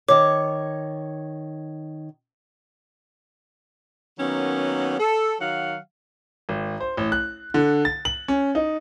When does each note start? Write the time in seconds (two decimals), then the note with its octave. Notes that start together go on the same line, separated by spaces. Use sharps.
0.08 D#3 C#5 D6
4.19 D#3 F#3 A#3 B3 C#4
4.99 A4
5.40 D#3 F#3 F#4 F5 F#5
6.49 G#1
6.81 C5
6.97 A1
7.12 F#6
7.54 D3
7.85 A6
8.05 F#7
8.28 C#4
8.55 D#4